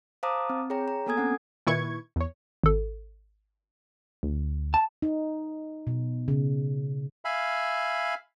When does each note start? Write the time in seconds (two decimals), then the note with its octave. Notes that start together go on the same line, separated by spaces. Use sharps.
0.23 C5 F5 A5 A#5 D6 D#6
0.50 C4
0.70 G#4 C#5 G5 A#5
0.88 A#5
1.06 A#3 B3 A4 G#5 D#6 G#6
1.17 C4 C#4 F#5
1.67 A#2 D#3 E4 B4 C#6 G#6
2.16 E2 C#5
2.64 G#1 A4
4.23 D2
4.74 A5
5.02 D#4
5.87 B2
6.28 C#3
7.25 E5 F5 G#5 B5